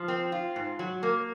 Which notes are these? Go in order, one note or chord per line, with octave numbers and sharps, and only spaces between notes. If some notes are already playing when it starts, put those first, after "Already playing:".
Already playing: F3
C4
F4
G#2
F#3
A#3